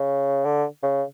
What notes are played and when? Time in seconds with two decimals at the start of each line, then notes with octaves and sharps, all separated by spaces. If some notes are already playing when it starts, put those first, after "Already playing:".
Already playing: C#3
0.45 D3
0.83 C#3